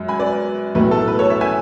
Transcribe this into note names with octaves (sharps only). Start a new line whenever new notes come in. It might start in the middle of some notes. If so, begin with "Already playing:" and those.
Already playing: F#2 G#3
G#5 B5
B4 D5
B1 A2 F#3 A3 B4
A4
B4
A4 C#5
C#5 E5
E5 G#5